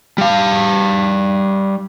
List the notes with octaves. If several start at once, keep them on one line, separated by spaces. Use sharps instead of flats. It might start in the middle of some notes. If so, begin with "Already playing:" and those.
G3 F5